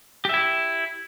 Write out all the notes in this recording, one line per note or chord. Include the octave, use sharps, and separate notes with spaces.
E4 G4 E5